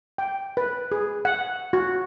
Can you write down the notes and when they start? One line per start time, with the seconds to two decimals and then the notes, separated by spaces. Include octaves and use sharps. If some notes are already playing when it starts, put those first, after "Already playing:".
0.18 G5
0.57 B4
0.92 G#4
1.25 F#5
1.73 F#4